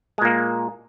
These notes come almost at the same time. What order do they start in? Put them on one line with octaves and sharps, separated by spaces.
G#3 A#2 A#3